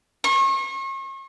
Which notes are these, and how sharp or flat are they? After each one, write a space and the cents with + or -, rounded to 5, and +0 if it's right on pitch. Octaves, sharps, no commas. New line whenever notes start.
C#6 -40